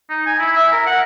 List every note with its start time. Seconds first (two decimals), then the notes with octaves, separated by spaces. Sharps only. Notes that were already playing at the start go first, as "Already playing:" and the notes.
0.09 D#4
0.26 G#5
0.39 E4
0.56 E5
0.72 A#4
0.86 F#5